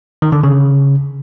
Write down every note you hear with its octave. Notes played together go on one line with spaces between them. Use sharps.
D#3
D3
C#3